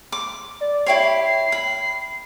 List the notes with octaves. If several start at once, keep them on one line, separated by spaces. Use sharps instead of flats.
D6
D5
E4 G4 C#5 C7
B5